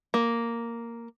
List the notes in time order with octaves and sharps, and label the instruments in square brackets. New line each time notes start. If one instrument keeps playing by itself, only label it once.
[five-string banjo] A#3